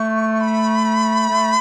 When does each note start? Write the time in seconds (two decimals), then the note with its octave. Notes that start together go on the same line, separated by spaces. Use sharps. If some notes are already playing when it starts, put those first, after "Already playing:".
Already playing: A3 C#6
0.41 B5
1.30 A3